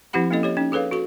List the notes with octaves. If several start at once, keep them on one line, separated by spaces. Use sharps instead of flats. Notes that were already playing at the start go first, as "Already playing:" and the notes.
F3 C4 E4 G4 F#5 B5
A#3 C#4 E4 A4 D#5
G4 C#5 D#5
C#4 D#4
G#4 A4 B4 C#5 F5
F#4 A4 C#6